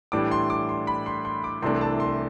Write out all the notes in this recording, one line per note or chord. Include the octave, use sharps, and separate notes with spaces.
A2 E3 G3 D4 D6
C6
D6
C6
B5
C6
C6
D6
C2 C3 E3 A3 D4 C6
A5
C6